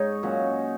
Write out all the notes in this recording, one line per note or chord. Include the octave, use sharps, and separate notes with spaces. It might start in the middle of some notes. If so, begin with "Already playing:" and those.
Already playing: G#2 D#4 C#5
A#2 F#3 C#4